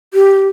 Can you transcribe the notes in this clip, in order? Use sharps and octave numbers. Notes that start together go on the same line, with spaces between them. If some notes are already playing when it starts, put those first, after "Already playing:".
G4